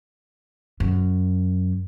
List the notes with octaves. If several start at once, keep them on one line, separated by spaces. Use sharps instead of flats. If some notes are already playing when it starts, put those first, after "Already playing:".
F#2